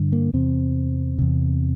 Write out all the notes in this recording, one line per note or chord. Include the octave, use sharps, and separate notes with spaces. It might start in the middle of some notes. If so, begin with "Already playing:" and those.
Already playing: G2 D3
A#3
E2 C3 C4
E2 C3